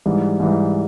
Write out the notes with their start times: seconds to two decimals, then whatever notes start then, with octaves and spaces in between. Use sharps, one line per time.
0.06 G#2 E3 G3
0.40 G#2 E3 G3